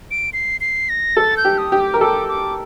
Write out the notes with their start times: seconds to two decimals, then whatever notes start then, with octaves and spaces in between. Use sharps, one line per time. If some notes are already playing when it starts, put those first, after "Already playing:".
0.11 D7
0.33 C7
0.61 C7
0.89 A#6
1.16 A4 A6
1.37 G6
1.45 G4
1.58 D#6
1.72 G4
1.80 D6
1.94 A#4
2.01 A4 D6
2.29 D6